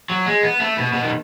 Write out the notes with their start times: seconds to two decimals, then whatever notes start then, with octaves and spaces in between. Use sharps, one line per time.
0.10 F#3
0.26 G#3
0.43 B3
0.60 A3
0.77 B2
0.93 B2
1.02 D#3